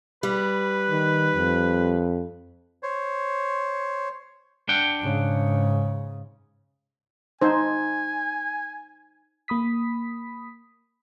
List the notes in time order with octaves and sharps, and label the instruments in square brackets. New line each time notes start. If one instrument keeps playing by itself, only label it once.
[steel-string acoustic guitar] G3 [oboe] B4
[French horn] D#3
F2
[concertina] C5 C#5
[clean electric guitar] D4 F#5 G5
[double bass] G#2 C#3
[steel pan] D#4 C5 [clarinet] G#5
[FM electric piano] A#3 B5 D#6 B6